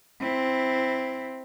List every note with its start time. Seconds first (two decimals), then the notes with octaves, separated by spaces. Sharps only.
0.20 C4 E4